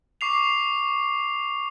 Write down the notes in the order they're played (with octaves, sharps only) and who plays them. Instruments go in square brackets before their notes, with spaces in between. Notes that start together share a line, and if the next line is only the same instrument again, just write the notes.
[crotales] C#6 D6 C7 F7